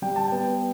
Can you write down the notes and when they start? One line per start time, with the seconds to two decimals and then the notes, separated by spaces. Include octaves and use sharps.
0.02 G3 G5
0.16 A5
0.28 B3 G5